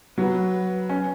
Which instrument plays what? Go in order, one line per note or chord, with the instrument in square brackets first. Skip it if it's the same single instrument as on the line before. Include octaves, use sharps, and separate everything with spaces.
[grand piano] F#3 [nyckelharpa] B4
[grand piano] C#4